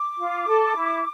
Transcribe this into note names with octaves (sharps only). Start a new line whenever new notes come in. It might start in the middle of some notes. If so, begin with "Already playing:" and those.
Already playing: D6
F4
A4
E4